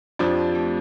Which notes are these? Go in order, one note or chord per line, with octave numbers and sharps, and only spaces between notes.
F2 F3 D4 G4
C4
A3